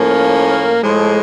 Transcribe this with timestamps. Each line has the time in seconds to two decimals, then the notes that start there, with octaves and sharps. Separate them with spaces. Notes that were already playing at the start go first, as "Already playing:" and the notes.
Already playing: A2 F3 A#3 C#4
0.82 A2 F3 G#3